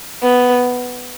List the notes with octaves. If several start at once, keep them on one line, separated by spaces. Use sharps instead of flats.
B3